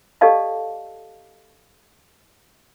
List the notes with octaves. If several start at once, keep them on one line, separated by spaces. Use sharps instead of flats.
G4 A4 D5 D#5 F5 A5